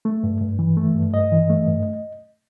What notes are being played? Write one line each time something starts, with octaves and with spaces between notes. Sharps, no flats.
A3
G2
G2
E3
A3
G2
G2 D#5
E3
A3
G2